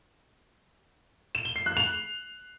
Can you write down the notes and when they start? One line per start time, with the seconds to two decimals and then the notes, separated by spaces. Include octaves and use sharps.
1.35 E7
1.45 G7
1.56 C7
1.66 F#6
1.77 F7